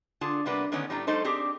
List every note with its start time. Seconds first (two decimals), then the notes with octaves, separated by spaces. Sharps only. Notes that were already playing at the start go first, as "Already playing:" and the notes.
0.21 D3 F4 G#4 A5
0.46 C3 G3 A#3 B3 D4 B4
0.72 D3 D#3 A3 B3 C#4
0.90 A2 G3 A3 D4 A#5
1.07 G3 A3 D#4 A4 C5
1.24 C4 D4 G4 G#4